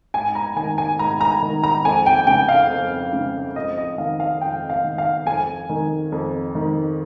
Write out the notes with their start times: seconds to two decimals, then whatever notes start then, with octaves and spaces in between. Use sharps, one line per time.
0.14 G#2 G#5
0.35 A#5
0.56 D#3 G#5
0.78 G#5
0.99 G#2 A#5
1.21 A#5
1.42 D#3
1.64 A#5
1.85 F2 G#5
2.06 G5
2.27 C#3 G5
2.49 F5
2.70 F2
3.13 C#3
3.56 F2 D#5
3.77 D#5
3.98 D#3 F5
4.20 F5
4.41 F2 G5
4.70 F5
4.84 D#3
4.98 F5
5.27 F2 G#5
5.69 D#3
6.12 F2
6.55 D#3